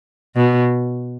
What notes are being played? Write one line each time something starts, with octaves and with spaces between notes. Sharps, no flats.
B2